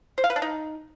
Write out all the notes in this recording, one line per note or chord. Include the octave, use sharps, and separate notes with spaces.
C5
F5
B4
D4
D#4